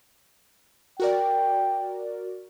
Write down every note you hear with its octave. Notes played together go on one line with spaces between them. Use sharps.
F#4 A#4 D5 G5